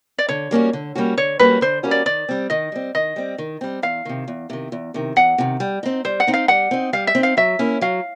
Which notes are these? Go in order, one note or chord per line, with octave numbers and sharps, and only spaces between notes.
D5
D3 C#5
G3 A#3 C#4 F#4
D3
G3 A#3 C#4 F#4
D3 C#5
G3 A#3 C#4 F#4 B4
D3 C5
G3 A#3 C#4 F#4
D5
D#3 D5
G3 C4
D#3 D#5
G3 C4
D#3 D#5
G3 C4
D#3
G3 C4
E2 F5
C3 D#3
E2
C3 D#3
E2
C3 D#3
E2 F#5
C3 D#3
G3
C4 D#4
G3 C5
F#5
C4 D#4
F5
G3 F#5
C4 D#4
G3 F5
E5
C4 D#4
F5
F#3 E5
A#3 C#4 E4
F#3 F5